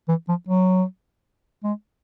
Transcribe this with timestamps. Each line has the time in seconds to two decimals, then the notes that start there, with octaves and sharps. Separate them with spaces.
0.09 E3
0.29 F3
0.49 F#3
1.64 G#3